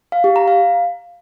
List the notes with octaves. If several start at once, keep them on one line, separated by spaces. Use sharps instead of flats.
F5
G4
A#5
F5